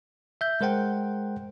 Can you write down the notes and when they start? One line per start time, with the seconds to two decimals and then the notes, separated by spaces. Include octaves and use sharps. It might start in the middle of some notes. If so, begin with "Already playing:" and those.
0.41 E5 G6
0.61 G#3 A#4 C5 F#5 G5